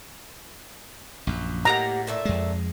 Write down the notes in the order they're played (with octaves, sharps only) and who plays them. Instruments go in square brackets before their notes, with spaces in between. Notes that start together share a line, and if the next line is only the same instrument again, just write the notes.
[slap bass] A#1 F#2
[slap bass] A2 [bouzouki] A#3 G4 F#5 [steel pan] A#5
[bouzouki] A#2 A3 E5
[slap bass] F2 G#3